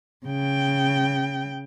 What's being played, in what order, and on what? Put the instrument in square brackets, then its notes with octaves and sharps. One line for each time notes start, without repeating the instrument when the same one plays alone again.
[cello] C#3 G5